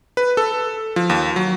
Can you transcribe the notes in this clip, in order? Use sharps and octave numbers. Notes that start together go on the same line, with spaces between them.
B4
A4
F3
D#2
F#3